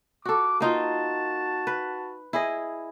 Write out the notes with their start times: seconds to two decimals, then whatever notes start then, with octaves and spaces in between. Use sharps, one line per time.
0.25 F#4 A4 D6
0.60 A#3 D#4 F4 F#4 A5
1.67 B4
2.33 E4 G#4 D#5